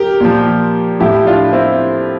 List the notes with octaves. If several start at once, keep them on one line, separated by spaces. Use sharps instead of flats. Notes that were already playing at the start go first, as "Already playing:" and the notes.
Already playing: G4 A#4
A#2 F3
A2 F3 E4 G4
D4 F4
C4 E4